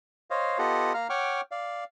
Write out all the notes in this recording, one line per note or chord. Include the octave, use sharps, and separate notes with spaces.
C5 C#5 D#5 F5
B3 F4 G4 A4 D#5 F#5
A#3 F5 A#5 F6
C#5 F#5 G5 C#6 D6 F6
D5 F5